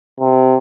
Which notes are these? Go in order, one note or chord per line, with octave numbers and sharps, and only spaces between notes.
C3